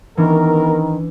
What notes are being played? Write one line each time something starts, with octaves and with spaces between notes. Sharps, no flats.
D#3 E3 B3 C#4 D4 A#4